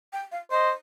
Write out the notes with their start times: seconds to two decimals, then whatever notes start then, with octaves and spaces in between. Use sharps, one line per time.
0.13 G5
0.32 F5
0.51 C5 D#5